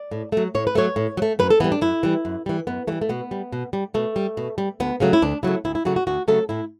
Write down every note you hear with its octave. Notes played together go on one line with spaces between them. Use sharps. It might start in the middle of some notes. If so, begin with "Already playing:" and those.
Already playing: D5
A2
F#3 A3
A2 C#5
B4
F#3 A3 C#5
A2
F#3
A3
F#2 B4
A4
E3 G3 B3
D4
F#2 E4
E3 G3
F#2
E3 G3
F#2 B3
E3 G3 A3
A3
B2 B3
G3
B2
G3
B2 A3
G3
B2
G3
D2 B3
C#3 F#3 A3 C#4
E4
D2 D4
C#3 F#3 A3 E4
D2 E4
E4
C#3 F#3 A3 F#4
F#4
D2 F#4
C#3 F#3 A3 A4
A2 E4